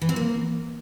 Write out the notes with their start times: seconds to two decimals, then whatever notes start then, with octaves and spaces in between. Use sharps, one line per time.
0.02 E3
0.09 C4
0.16 A#3